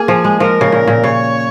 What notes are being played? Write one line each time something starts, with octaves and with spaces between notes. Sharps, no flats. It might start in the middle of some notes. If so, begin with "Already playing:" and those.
Already playing: A#3 G#4
F3
G#3
F3 A#4
C#3
A#2
A#2
C#3 C#5